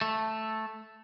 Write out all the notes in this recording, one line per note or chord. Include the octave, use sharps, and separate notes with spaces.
A3